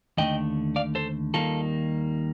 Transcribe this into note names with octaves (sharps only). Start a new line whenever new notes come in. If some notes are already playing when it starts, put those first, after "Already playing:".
D#2 D3 A3 D#5 G5
D5 F5
A4 C5
D#2 D#3 G3 A#3 F4 A4